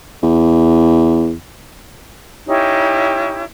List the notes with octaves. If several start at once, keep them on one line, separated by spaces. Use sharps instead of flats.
E2
C#4 D#4 E4 G4